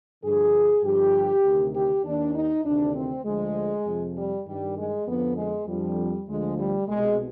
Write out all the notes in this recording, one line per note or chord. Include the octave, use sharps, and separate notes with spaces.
G2 D3 F3 G#4
G2 D3 F3 G4
D2 C3 D#3
G4
D#2 D#3 D4
D#4
D2 C3 D#3 D4
C4
D2 D3 F3 G#3
F2 C3 F3
G3
G2 D#3 G3
G#3
F2 D3 F3 B3
G#3
F2 D3 F3 G3
D2 D3 F3 G#3
G3
C2 B2 G#3